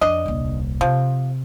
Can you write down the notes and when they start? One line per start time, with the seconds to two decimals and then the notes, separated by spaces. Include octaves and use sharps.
0.01 F2 D4 D#5
0.26 D#1 C2
0.81 C3 F3